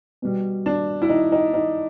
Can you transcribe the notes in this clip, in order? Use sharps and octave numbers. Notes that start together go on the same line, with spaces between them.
B2 G3
D4
E4
D#4
D#4
D#4